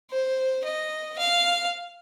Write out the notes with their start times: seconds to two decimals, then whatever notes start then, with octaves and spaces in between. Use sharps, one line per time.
0.11 C5
0.64 D#5
1.18 F5